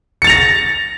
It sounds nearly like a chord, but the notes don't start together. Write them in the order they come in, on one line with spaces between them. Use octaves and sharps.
C#7 A6 F7 A#6